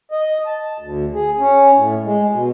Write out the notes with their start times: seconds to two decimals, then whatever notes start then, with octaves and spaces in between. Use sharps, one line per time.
0.12 D#5
0.47 A5
0.80 D2
1.14 G#4
1.39 C#4
1.75 A2
2.04 G#3
2.33 B2